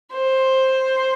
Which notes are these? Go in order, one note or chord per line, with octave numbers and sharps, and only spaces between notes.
C5